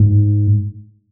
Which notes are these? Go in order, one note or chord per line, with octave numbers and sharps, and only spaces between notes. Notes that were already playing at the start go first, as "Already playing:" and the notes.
Already playing: G#2